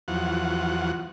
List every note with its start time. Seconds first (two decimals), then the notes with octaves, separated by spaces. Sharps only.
0.08 E2 F3 F#3 F#5